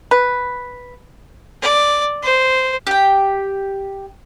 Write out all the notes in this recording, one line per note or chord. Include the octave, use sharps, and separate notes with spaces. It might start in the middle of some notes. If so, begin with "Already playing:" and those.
B4
D5
C5
G4 G5